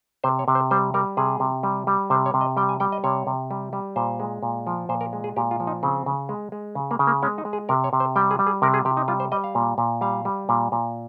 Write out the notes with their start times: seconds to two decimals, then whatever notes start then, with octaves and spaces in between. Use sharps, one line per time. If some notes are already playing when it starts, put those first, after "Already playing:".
0.24 C3 C5
0.39 C#5
0.48 C3
0.55 C5
0.71 G3 C5
0.94 G3 A#4
1.17 C3 G#4
1.40 C3
1.63 G3
1.87 G3
2.10 C3 C5
2.26 C#5
2.34 C3
2.41 D#5
2.57 G3 G5
2.69 G#5
2.80 G3 G5
2.92 D#5
3.04 C3 C#5
3.27 C3
3.51 G3
3.73 G3
3.96 A#2 C5
4.20 G#3
4.43 A#2
4.67 F3
4.89 A#2 C5
5.01 A#4
5.13 G#3
5.24 G#4
5.36 A#2 G4
5.51 F4
5.60 F3
5.67 D#4
5.83 C#3 C4
6.06 C#3
6.29 G#3
6.52 G#3
6.75 C#3
6.91 A#3
6.99 C#3
7.07 A#3
7.23 G#3 C#4
7.38 D#4
7.45 G#3
7.53 G#4
7.69 C3 A#4
7.84 C#5
7.93 C3
8.00 C5
8.16 G3 G5
8.31 G#4
8.39 G3
8.47 G#4
8.62 C3 A#4
8.74 G#4
8.85 C3 G4
8.97 D#4
9.08 G3 F4
9.20 C5
9.32 G3 D#5
9.44 F5
9.55 A#2
9.78 A#2
10.01 G3 F5
10.25 G3
10.49 A#2
10.72 A#2